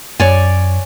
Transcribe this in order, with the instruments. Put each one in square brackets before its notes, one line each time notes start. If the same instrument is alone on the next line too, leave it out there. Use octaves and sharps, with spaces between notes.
[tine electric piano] F#2 [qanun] C#5 D5 G#5